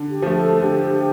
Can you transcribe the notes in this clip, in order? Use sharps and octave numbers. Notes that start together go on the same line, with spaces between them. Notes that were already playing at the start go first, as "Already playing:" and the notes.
Already playing: D3
G4
F3 A3
A4
D3 G4